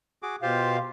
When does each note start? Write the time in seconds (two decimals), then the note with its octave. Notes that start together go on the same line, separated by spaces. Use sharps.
0.23 F#4 G#4 D6
0.42 B2 F4 G4 C5 F5